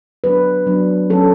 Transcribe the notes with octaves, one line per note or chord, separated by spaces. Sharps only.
F#3 B3 D4 B4
F#3 B3 D4
F#3 C#4 A4